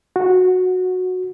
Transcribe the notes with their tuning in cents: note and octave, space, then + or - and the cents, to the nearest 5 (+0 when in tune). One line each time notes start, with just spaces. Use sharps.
F#4 -10